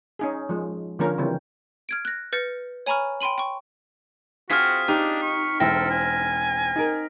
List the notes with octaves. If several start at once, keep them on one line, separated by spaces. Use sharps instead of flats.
C#4 D#4 G#4
F3 G#3
D3 F3 A#3 C#4 A#4
C#3 E3 G3 C4
F6 G#6 D7
F#6 A#6
B4 F6 G6 A6 A#6 C#7
C#5 G#5 A#5 B5 C#6 F6
G5 B5 C6 D#7 F#7
G5 C#6
C4 F4 F#4 G#4 F6 B6
D4 D#4 G4
C#6
E1 C4 E4 A4 G5 A#6
G#5
D#4 A#4